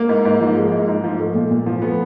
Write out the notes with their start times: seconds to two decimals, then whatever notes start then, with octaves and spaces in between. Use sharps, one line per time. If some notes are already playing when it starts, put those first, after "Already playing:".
Already playing: A#3
0.09 G#2
0.25 G#2
0.40 F3
0.57 G#3
0.72 G#2
0.88 G#2
1.04 F3
1.20 A3
1.35 A#2
1.51 A#2
1.66 F3
1.82 A3 B3